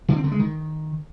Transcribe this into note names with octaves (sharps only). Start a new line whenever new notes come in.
D3
C4
D3
G#3
D#3